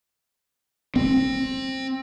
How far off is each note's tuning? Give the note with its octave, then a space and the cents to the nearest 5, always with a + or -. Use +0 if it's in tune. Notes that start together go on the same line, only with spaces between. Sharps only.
C4 +20